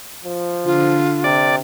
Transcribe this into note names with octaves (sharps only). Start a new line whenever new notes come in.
F3
D3 F4
C3 D5